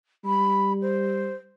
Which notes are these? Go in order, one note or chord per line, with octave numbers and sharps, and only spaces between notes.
G3 B5
C5